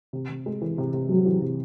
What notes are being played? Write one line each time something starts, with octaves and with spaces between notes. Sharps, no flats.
C3
C3
G#3
E3
C3
C3
F#3 G#3
E3
C3